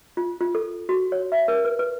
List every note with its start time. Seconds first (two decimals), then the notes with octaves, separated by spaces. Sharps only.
0.17 F4
0.41 F4
0.55 A4
0.89 F#4
1.12 C#5
1.32 E5
1.48 A#4
1.65 B4
1.79 B4